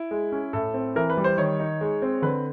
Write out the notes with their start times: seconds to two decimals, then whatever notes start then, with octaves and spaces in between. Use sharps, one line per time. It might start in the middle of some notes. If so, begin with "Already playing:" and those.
Already playing: E4
0.11 G#3
0.32 C#4
0.53 A2 A4
0.74 C4
0.95 E3 A#4
1.10 B4
1.17 G3
1.24 C5
1.38 D#3 C#5
1.60 D#4
1.81 G#3
2.02 C4
2.22 D3 B4